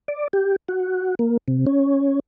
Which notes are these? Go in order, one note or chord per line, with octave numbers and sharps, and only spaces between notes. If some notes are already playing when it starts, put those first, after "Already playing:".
D5
G4
F#4
A#3
C3
C#4